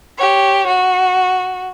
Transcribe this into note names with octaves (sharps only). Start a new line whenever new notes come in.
G4 C#5
F#4